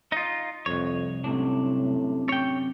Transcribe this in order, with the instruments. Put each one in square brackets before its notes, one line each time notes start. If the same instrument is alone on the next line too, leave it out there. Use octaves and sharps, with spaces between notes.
[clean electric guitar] D#4 F4 [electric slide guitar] D#5
[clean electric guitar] C2 C#5 [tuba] F2
[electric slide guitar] F#2 C3 D4 [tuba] A2
[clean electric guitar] C#5 G5